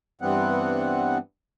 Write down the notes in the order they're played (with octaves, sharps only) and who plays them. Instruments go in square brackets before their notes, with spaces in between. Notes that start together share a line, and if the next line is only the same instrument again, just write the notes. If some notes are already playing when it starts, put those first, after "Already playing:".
[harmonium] G2 E3 G3 B3 C4 F#5